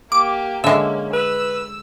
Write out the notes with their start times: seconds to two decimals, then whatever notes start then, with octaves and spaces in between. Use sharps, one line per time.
0.12 A#3 G4 D6
0.64 D3 G#3 A#3 C#4 E5
1.13 B4 E6